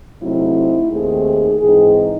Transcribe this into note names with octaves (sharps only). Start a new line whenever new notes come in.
C3 F#3 A3 C4 D#4 E4
D#2 D#3 A3 C4 G#4
G#2 E3 C4 D#4 G#4